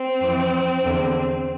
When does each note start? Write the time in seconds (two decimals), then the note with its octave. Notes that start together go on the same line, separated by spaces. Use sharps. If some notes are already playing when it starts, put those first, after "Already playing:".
Already playing: C4
0.19 F2 E3
0.83 E2 D3